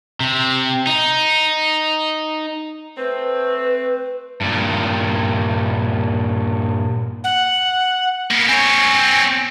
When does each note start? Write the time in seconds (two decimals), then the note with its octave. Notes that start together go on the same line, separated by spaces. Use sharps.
0.20 C3
0.87 D#4
2.97 A3 C4 B4
4.41 G2 A#2
7.24 F#5
8.31 A#3 B3
8.48 C4 C#5 G#5